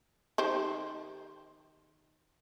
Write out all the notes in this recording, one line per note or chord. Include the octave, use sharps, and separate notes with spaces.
D#3 G4 C5